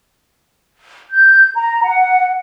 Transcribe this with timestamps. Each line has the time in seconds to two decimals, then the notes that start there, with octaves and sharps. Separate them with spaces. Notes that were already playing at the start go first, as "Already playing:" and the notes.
1.11 G6
1.55 A#5
1.83 F#5